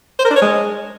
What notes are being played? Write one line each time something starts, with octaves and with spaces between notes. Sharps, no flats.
C5
A#4
D4
C#5
G#3